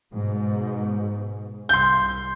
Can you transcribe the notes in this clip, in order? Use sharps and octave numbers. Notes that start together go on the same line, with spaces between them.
G#2 B2
C2 C6 G6